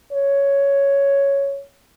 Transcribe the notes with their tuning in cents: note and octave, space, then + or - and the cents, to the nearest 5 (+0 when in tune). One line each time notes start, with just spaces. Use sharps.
C#5 +5